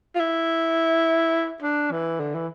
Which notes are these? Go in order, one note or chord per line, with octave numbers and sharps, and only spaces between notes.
F4
E4
D4
E3
D3
E3